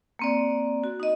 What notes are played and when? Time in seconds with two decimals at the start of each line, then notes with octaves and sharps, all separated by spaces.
0.19 A#3 C4 D5
0.84 F#4
1.00 D#4 D#5